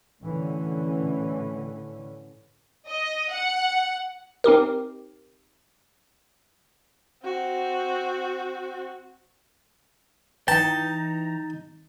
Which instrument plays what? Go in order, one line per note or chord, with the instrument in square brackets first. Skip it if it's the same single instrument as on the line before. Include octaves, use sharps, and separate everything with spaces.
[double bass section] A2 D3 E3 C#4
[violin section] D#5
F#5
[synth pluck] C4 D#4 G4 A#4
[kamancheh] C4 F#4
[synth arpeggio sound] E3 A#5 [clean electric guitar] D#4 G5 [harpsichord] A5